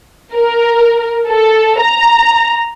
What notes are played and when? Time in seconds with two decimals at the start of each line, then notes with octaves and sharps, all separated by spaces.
0.34 A#4
1.27 A4
1.79 A#5